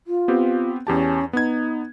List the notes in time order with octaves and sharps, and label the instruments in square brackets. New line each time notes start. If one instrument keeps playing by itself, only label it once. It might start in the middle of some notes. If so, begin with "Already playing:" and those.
[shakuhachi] F4
[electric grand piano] B3 C4 G4
[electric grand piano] E2 G4 A5 [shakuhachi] C#4
[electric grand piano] B3 G#6 [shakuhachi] D#4